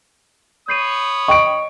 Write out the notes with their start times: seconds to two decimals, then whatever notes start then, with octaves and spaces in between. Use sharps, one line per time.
0.68 C#5 B5 D#6 G6 C7 D#7
1.28 D#5 G5 C#6 D7